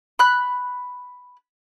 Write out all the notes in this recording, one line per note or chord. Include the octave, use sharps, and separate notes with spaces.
B5 F#6